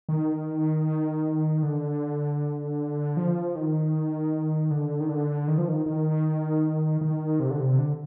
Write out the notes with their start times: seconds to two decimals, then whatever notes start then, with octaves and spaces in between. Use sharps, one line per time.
0.09 D#3
1.63 D3
3.17 F3
3.55 D#3
4.71 D3
5.00 D#3
5.09 D3
5.48 D#3
5.58 F3
5.68 D#3
5.86 D#3
7.01 D#3
7.40 C3
7.50 D3
7.60 C3
7.78 D3